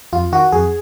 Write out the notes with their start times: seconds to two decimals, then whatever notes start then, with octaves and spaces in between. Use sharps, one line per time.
0.13 F2 F4
0.33 D#3 F#4
0.52 F2 G#4